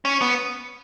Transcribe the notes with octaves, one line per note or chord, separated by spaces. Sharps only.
C#4
B3